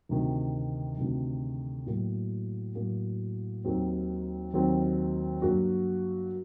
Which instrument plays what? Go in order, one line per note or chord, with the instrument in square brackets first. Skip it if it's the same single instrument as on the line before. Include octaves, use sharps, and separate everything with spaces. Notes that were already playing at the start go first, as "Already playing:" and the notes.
[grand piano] D2 C3 D#3
D2 C3 D#3
A2 F#3 A#3
A2 F#3 A#3
D#2 D#3 F#3 C4
D#2 D#3 F#3 C4
G2 F#3 A#3 F#4